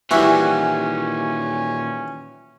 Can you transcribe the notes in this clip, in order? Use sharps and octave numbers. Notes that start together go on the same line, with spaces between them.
A#2 D#3 E3 G3 C#4 F#4 E5